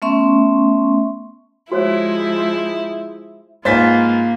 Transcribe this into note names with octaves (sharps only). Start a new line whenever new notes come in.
A3 B3 C#4 E5 C6 C#6
F3 G#3 E4 F#4 C5 C#5
G#2 A#3 F4 B4 C5 G#5 A6 B6